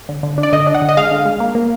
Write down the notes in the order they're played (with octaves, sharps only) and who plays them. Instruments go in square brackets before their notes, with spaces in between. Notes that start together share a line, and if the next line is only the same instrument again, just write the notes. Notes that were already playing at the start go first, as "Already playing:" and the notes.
[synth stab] D3
D3
D4
D5
D3 D#5
D4
F#5
D3
D#5
G#3 F5
D3
G#3
A#3
A#3